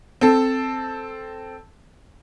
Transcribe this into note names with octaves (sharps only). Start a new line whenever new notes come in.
C4 A4